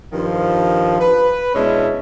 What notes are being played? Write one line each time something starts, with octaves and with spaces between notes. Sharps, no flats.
G2 D#3 F3
B4
B2 G#3 C#4 D4 E4